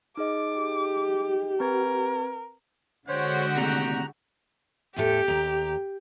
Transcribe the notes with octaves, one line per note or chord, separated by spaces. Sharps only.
D#4 G#4 D#5 D6
G4
C4 A#4 B4 G#6
D3 G#3 F#4 G4 C5 C#5 F#5 G5
D#2 A2 C3 A#5 F#6
E2 A2 G4 A4
D#2 A#5